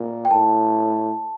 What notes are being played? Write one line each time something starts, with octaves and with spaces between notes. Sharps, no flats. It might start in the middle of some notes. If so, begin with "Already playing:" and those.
Already playing: A#2
G5
A2 A5